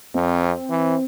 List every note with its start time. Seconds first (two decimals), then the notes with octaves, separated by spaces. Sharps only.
0.15 F2 C4
0.70 E3